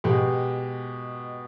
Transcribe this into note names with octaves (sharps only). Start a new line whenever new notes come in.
B2 G#3 G4